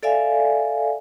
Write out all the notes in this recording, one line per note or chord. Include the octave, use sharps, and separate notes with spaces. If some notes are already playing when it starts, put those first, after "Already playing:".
A4 D5 E5 F5 G#5